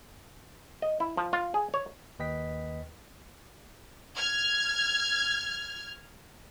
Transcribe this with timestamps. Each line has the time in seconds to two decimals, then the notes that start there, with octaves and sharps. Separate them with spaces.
0.82 D#5
1.00 E4
1.17 F3
1.33 F4
1.54 G#4
1.74 C#5
2.19 D#2 B4 D#5 G5 B6
4.16 F6 G#6